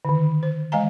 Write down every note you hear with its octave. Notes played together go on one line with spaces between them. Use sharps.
D3 D#3
C5
E3 G#3 D#5 F5 G#5 A#5